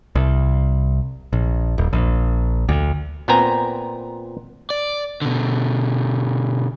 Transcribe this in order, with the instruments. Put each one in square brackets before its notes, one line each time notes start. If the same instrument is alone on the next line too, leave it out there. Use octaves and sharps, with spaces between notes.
[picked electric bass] C2
A#1
D#1
A#1
D2
[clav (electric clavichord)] A#2 B3 C4 G5 G#5 A#5
[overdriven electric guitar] D5
B2 D3